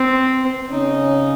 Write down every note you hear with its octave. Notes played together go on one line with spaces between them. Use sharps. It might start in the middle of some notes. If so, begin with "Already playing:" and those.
Already playing: C4
C#3 C#4 D#4